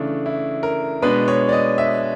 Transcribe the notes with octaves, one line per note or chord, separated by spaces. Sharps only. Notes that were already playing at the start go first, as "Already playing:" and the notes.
Already playing: C#3 E3 A3 D4
E4
A#4
B2 G#3 B3 D4 B4
C#5
D5
D#5
E5